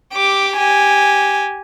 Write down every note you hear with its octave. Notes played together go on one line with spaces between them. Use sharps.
G4 D6
G4 G#5